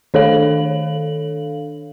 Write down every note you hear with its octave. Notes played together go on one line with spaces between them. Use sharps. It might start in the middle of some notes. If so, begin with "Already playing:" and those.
D#3 D4 A4 C#5 F5 F#7